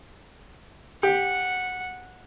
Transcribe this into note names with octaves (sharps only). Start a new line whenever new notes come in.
G4 F#5